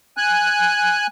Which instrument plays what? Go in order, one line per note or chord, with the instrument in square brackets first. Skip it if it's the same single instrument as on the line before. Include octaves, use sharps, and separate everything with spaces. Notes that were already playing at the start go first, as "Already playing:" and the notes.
[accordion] G#5 F#6